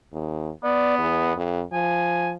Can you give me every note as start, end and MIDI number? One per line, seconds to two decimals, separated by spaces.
0.13 0.50 39
0.64 1.34 59
0.64 0.94 74
0.99 1.32 40
1.36 1.63 41
1.73 2.37 53
1.73 2.29 80